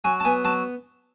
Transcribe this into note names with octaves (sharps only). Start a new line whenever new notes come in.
F#3 G#5
A5
B3 G#5
F#3 A5